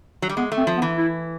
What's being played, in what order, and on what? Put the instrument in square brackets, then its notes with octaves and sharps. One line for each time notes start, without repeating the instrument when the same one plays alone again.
[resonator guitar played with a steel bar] F#3
G3
[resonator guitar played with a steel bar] G#3 [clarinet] B3
[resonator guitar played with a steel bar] A3
[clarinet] C4
[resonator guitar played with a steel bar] F3
[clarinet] B3
[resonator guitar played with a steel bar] E3
[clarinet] E4